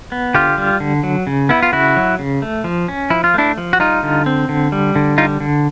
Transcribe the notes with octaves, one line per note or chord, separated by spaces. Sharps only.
B3
D3 F4 G4
G3
D3
F#3
C#3
B3 E4
F4
C#3 E4 F#4
F#3
C#3
A3
F3
C#4
F3 E4
F4
A3 D4 E4
F3
F#4
G3 D#4 F4
D3
C4
D3
G3
D3
G3 D#4 F4
D3